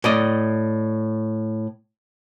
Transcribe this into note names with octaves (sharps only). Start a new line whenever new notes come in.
A2 D5 D#5